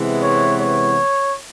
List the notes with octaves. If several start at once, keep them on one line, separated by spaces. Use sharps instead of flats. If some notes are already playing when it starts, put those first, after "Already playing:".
Already playing: C3 E3 G#3 B3
C#5
C#5